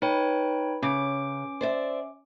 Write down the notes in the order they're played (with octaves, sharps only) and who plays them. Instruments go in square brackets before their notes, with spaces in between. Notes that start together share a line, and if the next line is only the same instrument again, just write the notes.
[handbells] D#4 C#5 G5 [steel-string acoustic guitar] B4
[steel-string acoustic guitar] C#3 [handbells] C#4 D6 D7
[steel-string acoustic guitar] C5 D5 E5